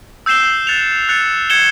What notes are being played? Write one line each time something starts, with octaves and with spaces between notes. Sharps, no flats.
E6 G6 C7 E7 G7
F#6 A6 C#7 F7
F#6 A6 C#7 F7
G#6 C#7 E7 G7